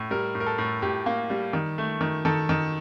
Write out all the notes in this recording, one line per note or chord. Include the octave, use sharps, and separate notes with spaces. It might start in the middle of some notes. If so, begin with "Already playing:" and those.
Already playing: A2
G3 A#4
A2
A#4
A4
A2
A2 G4
A#3
G3
D#3
A3
D#3
D#3 A4
D#3